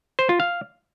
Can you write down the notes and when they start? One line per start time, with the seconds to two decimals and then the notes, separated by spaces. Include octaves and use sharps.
0.19 C5
0.29 F4
0.40 F5